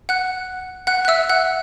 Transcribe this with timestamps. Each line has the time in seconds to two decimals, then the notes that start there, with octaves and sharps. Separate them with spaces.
0.09 F#5 F#6
0.87 F#5 F#6
1.05 F#6
1.08 E5 E6
1.29 F#5 F#6